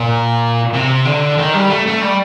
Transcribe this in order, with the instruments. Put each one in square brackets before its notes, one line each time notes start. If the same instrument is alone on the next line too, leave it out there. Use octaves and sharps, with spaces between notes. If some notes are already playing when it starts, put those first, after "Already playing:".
Already playing: [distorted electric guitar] A#2
C3
D3
D#3
G3
A3
A3
G3